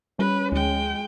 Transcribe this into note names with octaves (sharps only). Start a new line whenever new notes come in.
G3 C#4 B4
D2 G#3 G5